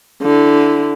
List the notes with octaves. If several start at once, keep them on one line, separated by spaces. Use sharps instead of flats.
D3 E4